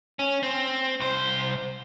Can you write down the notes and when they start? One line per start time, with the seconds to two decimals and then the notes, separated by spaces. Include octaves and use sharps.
0.19 C#4
0.43 C4
1.00 C2 C5